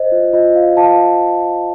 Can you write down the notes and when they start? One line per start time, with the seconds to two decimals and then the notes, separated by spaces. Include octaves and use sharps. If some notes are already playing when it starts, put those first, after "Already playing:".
Already playing: C5 D#5
0.12 F4
0.33 F4 D#5
0.55 F4 F5
0.77 F4 F5 A5